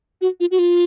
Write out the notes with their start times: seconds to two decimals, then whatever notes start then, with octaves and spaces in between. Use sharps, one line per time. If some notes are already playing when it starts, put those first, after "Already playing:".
0.21 F#4
0.40 F4
0.51 F#4
0.59 F4